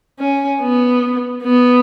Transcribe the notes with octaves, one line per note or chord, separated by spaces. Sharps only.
C#4
B3
B3